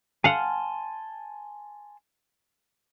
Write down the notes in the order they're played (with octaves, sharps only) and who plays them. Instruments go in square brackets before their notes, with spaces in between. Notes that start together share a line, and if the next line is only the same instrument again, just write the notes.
[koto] F5 F#5 [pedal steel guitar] G#5 A5 C6